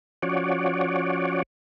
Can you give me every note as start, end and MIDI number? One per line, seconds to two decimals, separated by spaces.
0.22 1.43 53
0.22 1.43 61
0.22 1.43 66
0.22 1.43 73
0.22 1.43 74